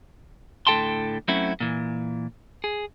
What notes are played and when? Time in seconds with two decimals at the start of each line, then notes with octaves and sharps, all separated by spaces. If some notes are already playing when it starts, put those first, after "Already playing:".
0.67 A2 D3 A4 G5 A5 C6
1.28 F#3 A3 C4 C#4 E4 F#4
1.60 A#2 E3
2.64 G#4